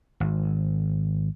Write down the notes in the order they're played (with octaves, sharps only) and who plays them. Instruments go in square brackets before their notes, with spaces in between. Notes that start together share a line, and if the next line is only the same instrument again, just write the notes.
[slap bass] G#1